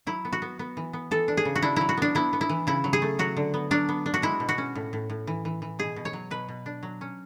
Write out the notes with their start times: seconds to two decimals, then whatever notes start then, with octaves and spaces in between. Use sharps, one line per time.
0.07 F#3 E4
0.25 B3
0.33 F#4
0.42 B3
0.59 B3
0.77 E3
0.93 B3
1.11 E3 A4
1.28 D4
1.37 G#4
1.45 C#3
1.55 F#4
1.62 D4 E4
1.76 F#3 E4
1.89 F#4
1.97 B3 D4
2.15 B3 E4
2.33 B3
2.41 E4
2.50 E3
2.67 C#3 E4
2.84 F#3
2.93 G#4
3.02 A3
3.19 F#3 F#4
3.37 D3
3.54 B3
3.71 F#3 D4
3.89 B3
4.06 D4
4.14 F#4
4.22 G#3 E4
4.40 B2
4.49 F#4
4.58 C#4
4.75 A2
4.93 A2
5.10 A2
5.27 E3
5.45 E3
5.62 E3
5.79 B2 G#4
5.96 B2
6.05 C#5
6.13 F#3
6.31 B2 B4
6.49 B2
6.66 D4
6.83 F#3
7.01 C#4